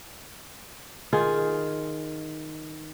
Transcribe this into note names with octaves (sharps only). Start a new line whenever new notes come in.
D#3 F4 G#4